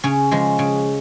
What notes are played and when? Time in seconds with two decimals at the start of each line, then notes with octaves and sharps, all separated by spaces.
0.04 C#3 C#4
0.31 F3 G#3
0.59 C#3